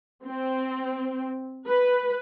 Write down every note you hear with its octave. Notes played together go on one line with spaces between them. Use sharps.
C4
B4